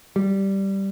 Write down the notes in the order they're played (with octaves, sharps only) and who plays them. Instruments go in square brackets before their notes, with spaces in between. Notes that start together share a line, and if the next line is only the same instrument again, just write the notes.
[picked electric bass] G3